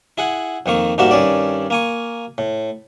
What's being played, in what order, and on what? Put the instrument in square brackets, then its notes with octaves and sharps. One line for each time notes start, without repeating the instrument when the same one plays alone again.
[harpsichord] E4 G#4 F#5
F2 D#3 A#3 C#6
G#2 G3 A#3 F#4 E5
G2 D#3 C#4 D5
A#3 G#5 C#6
A2